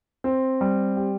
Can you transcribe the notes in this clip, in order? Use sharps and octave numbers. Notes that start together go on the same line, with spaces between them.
C4
G3
G4